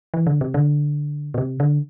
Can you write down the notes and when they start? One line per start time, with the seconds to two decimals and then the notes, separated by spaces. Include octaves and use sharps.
0.14 E3
0.27 D3
0.41 C3
0.54 D3
1.34 B2
1.38 C3
1.60 D3